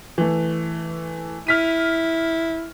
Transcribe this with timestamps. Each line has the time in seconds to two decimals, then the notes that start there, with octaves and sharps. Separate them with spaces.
0.18 E3 A3
1.47 E4 F6 B6 D#7